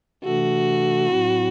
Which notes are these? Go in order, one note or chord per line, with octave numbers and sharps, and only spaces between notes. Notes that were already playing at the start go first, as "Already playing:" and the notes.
C3 E3 A3 D4 F#4 A4
A2 F#3 C4 E4